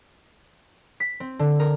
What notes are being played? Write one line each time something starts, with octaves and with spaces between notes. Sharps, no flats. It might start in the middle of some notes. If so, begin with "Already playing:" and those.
B6
C4
D3
A#4